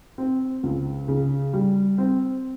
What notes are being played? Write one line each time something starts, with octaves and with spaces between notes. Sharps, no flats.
C4
C#2
C#3
G3
C4